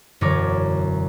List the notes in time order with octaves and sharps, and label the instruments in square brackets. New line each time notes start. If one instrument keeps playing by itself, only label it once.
[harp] E1 F#2 D3 A#4 C#5 D6